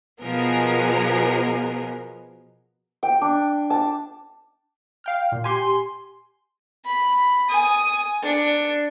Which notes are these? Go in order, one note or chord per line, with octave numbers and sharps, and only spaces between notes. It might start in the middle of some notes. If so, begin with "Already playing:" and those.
B2 F3 B3 G#4 A#4
G5
D4
A5
F5 G5 F6
A#2
G4 G#5 C6
B5
G#5 D#6
D4 C#7